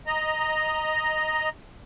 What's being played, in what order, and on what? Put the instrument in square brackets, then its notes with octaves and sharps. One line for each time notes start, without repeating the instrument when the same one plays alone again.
[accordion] D#5 A#5